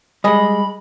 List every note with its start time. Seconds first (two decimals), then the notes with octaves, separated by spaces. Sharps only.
0.24 G3 G#3 G#4 D#5 B5